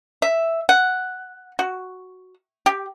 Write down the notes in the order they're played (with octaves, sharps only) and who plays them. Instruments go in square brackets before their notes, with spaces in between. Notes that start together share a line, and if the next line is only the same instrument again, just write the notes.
[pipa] E5
F#5
F#4
G4